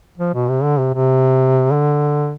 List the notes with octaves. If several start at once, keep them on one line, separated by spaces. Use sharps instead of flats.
F3
B2
C3
D3
C3
C3
D3